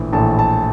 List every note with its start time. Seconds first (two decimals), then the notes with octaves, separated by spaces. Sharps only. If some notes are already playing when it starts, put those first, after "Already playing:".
Already playing: A#1 A2 E3
0.13 A#1 A2 E3 A5
0.39 A5